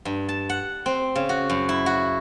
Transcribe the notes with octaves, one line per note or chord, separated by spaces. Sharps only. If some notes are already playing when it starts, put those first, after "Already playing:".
G2
A5
F#5
C4
C#3
F#4
F#2
E4
F#4